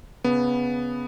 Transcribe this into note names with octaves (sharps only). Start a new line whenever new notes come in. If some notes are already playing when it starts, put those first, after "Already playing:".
C#3 B3